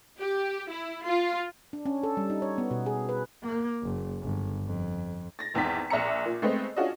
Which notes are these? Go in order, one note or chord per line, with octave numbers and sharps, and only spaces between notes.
G4
E4
F4
D4
C#4
A4
G3
D#4
C#5
B3
B2
G#4
B4
A#3
F#1
G1
F2
A6 A#6
G#1 E2 G#2 G5 B6
A#1 D5 E5 A#5 C#7
A#2
G#3 A3 B3 C4 D#5
C#4 D4 F4 F#4 G#4 D#5